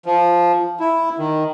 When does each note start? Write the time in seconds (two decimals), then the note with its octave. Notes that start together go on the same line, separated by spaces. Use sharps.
0.06 F3
0.80 E4
1.19 D#3